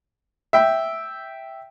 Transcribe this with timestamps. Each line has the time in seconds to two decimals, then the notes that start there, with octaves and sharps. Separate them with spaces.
0.53 E5 G5